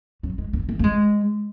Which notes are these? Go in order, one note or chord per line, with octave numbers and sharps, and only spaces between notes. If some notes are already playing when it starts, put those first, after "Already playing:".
F#3
G#3
A#3
A#3
A#3
G#3